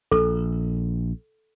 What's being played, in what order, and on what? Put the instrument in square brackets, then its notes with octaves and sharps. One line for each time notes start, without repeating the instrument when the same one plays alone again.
[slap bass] A#1 [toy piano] A4